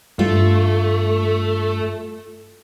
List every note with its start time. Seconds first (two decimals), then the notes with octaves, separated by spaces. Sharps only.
0.19 G2 A3 F4